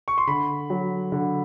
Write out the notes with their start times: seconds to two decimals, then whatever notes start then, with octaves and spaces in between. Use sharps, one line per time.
0.08 C#6
0.18 C6
0.27 D3 B5
0.70 F#3
1.12 D3